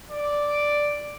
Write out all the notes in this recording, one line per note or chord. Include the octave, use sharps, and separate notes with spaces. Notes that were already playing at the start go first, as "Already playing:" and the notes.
D5